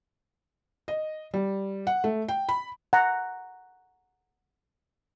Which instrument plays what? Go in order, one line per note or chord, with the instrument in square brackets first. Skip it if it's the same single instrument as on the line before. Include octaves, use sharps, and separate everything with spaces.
[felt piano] D#5
G3
F#5
A3
G5
B5
[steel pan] F#5 A#5